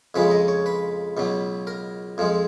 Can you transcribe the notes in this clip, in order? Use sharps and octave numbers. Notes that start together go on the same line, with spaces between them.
F2 C#3 F3 G#3 B4
D#5
C#5
B4
C#2 B2 F#3
A#4
F2 F3 G#3